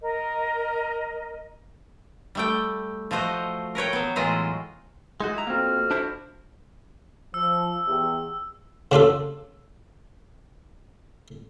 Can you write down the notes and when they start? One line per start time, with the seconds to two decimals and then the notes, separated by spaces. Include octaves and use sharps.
0.01 A#4 D#5
2.35 G3 A3 G5
3.11 F3 A3 F#4 C5 D#5
3.75 A#4 B4 C#5 G5
3.93 F#3 B3
4.16 A2 E3 F#3 G#3 F4 D#5
5.20 G#3 D#4 F#4
5.33 E4 A#5
5.47 F2 A#3 C4 F#4 F6
5.91 D4 E4 C5
7.34 F3 E6
7.87 E2 G4
8.92 C#3 D4 F4 A4